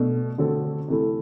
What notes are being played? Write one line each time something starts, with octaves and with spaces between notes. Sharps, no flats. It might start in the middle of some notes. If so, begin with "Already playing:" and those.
Already playing: B2 A3 D4
D3 A3 C4 F#4 A4
C3 E3 A3 E4 A4